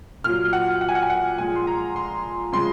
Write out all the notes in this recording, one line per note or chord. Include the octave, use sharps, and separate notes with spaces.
A#2 F#3 F6
F#5
F#5
G#5
F#5
G#5
F#5
A#2 F3 G#3 G#5
C6
A#5
C6
C#3 F3 G#3 C6